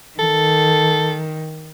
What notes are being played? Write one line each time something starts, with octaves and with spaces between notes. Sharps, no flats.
D#3 A4